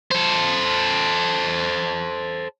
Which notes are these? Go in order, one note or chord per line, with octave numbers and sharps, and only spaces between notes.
A4 C5